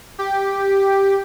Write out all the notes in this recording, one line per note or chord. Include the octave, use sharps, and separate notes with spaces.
G4